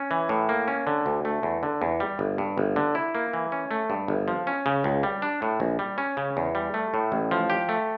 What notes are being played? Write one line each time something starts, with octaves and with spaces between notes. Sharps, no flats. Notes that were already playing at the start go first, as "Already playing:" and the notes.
Already playing: C#4
E3
A2
A#3
C#4
D3
D2
A3
E2
D3
E2
G3
G1
G2
G1
D3
E4
A#3
E3
C#4
A3
G2
G1
F3
C#4
C#3
C#2
G3
D4
A2
A#1
G3
C#4
C#3
E2
G3
A3
A2
A1
F3
G4
A3